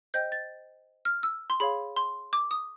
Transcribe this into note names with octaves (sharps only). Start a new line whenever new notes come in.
C5 D#5 G5 G6
A6
F6
E6
C6
G#4 C#5 F5 B5
C6
D6
D#6